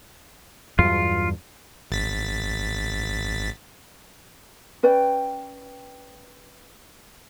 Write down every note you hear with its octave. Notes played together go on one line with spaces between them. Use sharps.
E2 G2 F#3 F4
G#1 A6 B6
C#4 B4 D5 G5